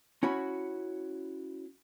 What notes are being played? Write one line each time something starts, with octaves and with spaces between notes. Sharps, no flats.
C#4 E4 F#4 C#5 B5